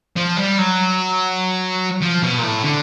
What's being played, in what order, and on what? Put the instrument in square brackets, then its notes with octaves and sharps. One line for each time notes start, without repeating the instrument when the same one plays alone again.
[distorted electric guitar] F3
G3
F#3
F3
B2
A#2
A2
D3